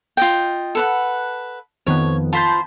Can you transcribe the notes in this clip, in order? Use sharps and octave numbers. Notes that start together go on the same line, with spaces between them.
F4 D#5 G5
A4 B4 F#5
F2 D#3 B3 C#5
F4 C5 A5 B5 G6